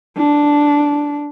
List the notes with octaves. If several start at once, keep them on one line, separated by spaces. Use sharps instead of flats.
D4